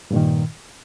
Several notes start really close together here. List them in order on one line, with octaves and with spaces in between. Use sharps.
G2 A#2 D#3